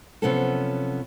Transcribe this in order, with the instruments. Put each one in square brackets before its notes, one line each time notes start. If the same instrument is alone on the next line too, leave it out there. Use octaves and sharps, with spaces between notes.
[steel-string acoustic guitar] C3 F3 F#3 B3 C#4 A4